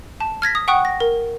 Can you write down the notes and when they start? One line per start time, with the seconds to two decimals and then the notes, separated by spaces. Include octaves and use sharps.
0.20 A5
0.42 F6 G#6 A#6 B6
0.55 D#6
0.68 F#5 G5 C#6 D#6 F#6
0.85 A#6
1.00 A#4